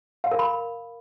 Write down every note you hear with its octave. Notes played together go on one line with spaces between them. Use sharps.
F5
A#4
B5